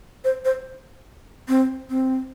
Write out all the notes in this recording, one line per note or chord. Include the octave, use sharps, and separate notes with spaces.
C5
C5
C4
C4